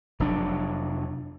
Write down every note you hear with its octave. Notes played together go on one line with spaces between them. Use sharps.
F1 F#3 D4